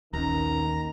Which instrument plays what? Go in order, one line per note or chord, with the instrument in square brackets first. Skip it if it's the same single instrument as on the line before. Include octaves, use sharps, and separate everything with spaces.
[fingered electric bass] A#1 C#4 [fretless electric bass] D#2 [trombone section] D#3 [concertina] A#5